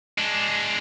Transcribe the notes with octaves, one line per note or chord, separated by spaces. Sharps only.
G#3 D4